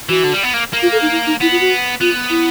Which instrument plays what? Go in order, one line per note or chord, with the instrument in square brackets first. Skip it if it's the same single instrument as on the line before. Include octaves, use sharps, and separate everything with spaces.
[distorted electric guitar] E3 [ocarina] F#4
[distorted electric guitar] D3
G3
B3
A#3
A#3
[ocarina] F4
A4
D#4
E4
D#4
[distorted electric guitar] B3 [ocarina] E4
[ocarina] F4
F#4
[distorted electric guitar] B3 [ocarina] F4
[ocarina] E4